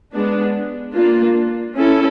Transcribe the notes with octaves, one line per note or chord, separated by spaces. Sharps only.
G#3 B3 D4
A#3 D4 F4
C#4 E4 A4